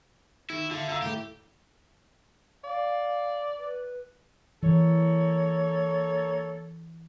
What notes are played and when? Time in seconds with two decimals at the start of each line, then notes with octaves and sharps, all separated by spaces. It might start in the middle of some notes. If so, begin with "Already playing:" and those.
0.50 D#3 E4
0.71 D3 F4 E5
0.89 D3 F5 A#5 E6
1.02 A2 G4 A4
2.64 D5 F5
3.58 B4
4.63 E3 A#3 A4 C#5